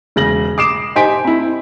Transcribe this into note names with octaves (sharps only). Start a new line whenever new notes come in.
E1 C#3 A#6 F#7
D6 D#6 C7 D7 E7
D#4 G4 C5 G#5 B6 D7
C4 E4